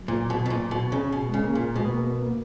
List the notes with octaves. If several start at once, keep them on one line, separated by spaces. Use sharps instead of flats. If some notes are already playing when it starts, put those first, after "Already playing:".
Already playing: F#3
A#2
B2
B2
A#2
B2
C#3
B2
C#3 G#3
A#3
A#2
B2 G#3
B3
A#3
B3
A#3